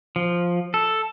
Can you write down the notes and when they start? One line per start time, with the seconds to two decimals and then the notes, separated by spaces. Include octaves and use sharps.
0.16 F3
0.74 A4